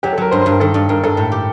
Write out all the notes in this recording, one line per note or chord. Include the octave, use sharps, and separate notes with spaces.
F#3 G4
A4
F#3 A#4
G2 C5
C5
G2
A#4
D#3 A4
G2
G2 A#4
G2 A4
A2
G4